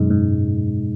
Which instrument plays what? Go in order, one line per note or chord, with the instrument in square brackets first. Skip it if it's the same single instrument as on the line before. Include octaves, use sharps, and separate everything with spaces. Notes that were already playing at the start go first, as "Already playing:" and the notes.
Already playing: [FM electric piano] F#2 [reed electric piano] B2 G#3 D#4
[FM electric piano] G#2